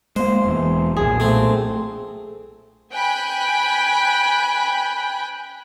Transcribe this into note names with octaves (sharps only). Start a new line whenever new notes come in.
G#3 A#3 C5
E1 E3
B1 A#2 G#4
A3 C4
G5 G#5 B5 F#6